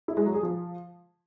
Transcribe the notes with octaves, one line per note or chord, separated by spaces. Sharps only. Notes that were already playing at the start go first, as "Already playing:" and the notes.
E4
G#3
F#3
G#4
F3